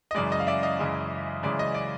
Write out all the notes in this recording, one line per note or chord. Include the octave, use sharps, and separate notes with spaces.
D#5
F#2 C#3 E3 G#3 D5
D#5
F5
D5 E5
D#5 F5
F#2 C#3 E3 G#3
F#2 C#3 E3 G#3 D5
D#5
D5